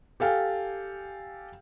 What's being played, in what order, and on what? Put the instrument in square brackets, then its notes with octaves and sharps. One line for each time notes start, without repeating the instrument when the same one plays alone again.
[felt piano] G4 A4 F5 G5 G#5